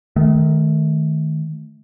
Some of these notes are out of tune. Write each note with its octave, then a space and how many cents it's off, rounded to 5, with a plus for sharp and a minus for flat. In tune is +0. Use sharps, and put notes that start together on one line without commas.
D#3 +0 A3 -25